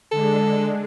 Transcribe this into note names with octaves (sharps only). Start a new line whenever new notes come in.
D3 G#3 D4 A4